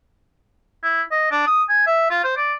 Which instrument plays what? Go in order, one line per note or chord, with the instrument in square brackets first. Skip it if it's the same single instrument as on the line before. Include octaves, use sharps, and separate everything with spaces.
[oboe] E4
D#5
D4
D#6
G#5
E5
F4
C5
D5